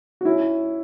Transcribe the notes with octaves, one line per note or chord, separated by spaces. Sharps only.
F#4
C#4 E4